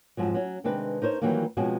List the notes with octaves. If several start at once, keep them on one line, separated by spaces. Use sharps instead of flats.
F2 G#2 F3 F#3
F#3 C#4
C3 D#3 G#3 C4 D4 B4
D#4 A#4 C5 C#5
D#3 E3 F#3 G3 A#3
B2 F3 G#3 C4 C#4 F#4